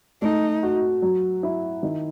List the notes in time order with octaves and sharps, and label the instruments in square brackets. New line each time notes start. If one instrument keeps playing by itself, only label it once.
[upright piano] A3 [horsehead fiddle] D#4
[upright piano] F#4
F#3
E4
D#3